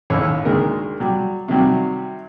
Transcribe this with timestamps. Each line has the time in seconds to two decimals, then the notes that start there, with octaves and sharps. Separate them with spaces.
0.10 A1 D#2 C#5 E6
0.45 D2 D#3 G#3 A#3 A#4
1.00 F#3 G3
1.48 C3 D#3 F#3 G3